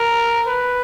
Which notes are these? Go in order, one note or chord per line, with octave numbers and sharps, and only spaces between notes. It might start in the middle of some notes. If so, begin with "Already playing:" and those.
Already playing: A#4
B4